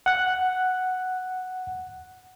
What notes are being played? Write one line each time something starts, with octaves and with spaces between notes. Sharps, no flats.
F#5 F#6